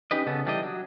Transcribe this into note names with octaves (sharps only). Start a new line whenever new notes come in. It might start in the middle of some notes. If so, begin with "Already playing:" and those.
C#4 D#4 G4 B4 D#5
C#3 B3 C#4 A4
E3 G3 D4 E4 D#5
F#3